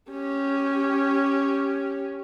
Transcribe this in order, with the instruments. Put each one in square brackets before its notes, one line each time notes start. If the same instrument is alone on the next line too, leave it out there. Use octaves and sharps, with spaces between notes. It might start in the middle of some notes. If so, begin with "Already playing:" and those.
[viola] C#4 G4